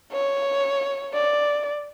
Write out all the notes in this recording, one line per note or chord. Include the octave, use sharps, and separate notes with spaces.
C#5
D5